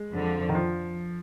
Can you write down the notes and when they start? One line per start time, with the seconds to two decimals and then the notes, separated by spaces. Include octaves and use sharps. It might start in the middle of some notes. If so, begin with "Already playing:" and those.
Already playing: G#3
0.12 F2 D3 F3
0.49 D#3
0.55 F3